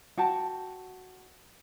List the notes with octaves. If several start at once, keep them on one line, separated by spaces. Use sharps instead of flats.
F#4 G5 A5